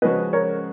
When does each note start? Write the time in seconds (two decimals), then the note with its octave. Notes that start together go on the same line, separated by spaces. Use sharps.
0.02 C#3 F3 G#3 C#4 F#4 B4 D#5
0.33 A#4 C#5